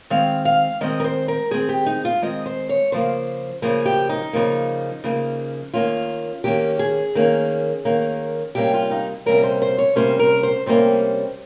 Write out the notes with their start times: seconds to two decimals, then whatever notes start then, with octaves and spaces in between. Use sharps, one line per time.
0.10 D#3 G#3 C4 F5
0.45 F5
0.81 D#3 G#3 C4 D#5
1.00 A#4
1.04 C5
1.28 A#4
1.51 D#3 G#3 C4 G#4
1.69 G4
1.86 D#4
2.05 F4
2.22 D#3 G#3 C4 D#5
2.46 C5
2.69 C#5
2.92 C#3 F3 A#3 C5
3.62 C#3 F3 A#3 G#4
3.86 G4
4.09 D#4
4.33 C#3 F3 A#3
5.04 C#3 F3 A#3
5.74 D#3 A#3 C#4 F4
6.44 D#3 A#3 C#4 G4
6.79 G#4
7.15 D#3 A#3 C#4
7.85 D#3 A#3 C#4
8.55 C3 G3 A#3 C#4 G4
8.74 F4
8.91 D#4
9.26 C3 G3 A#3 C#4 A#4
9.43 C5
9.62 C5
9.78 C#5
9.96 C3 G3 A#3 C#4 C5
10.19 A#4
10.43 C5
10.66 C3 G3 A#3 C#4 C5